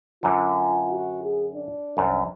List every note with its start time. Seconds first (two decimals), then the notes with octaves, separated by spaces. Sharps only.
0.23 F#2 D3 F4
0.92 F#4
1.23 G#4
1.55 D4
1.97 C2 F#2